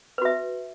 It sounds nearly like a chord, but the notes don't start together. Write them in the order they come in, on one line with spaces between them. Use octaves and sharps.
B4 F#4 E5